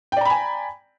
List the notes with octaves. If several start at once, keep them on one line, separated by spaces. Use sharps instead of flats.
D5 G5 G#5 A#5 B5